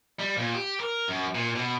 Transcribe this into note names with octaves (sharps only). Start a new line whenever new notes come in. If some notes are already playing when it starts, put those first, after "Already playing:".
G3
A#2
G4
A#4
F#2
A#2
B2